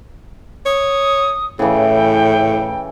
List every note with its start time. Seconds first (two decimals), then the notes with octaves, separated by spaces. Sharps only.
0.66 C#5 D#6
1.59 A2 C#3 E3 G5